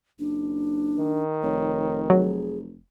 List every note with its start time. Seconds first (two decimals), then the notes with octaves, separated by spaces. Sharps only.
0.19 F#1 D4
0.98 D#3
1.43 F1 C#5
2.10 F#3 G#4